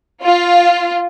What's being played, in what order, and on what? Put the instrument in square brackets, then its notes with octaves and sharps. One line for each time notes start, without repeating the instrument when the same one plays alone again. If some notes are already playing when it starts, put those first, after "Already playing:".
[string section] F4